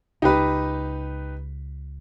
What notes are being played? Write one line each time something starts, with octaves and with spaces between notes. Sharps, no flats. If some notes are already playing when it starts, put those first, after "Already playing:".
C#2 D#4 G4 B4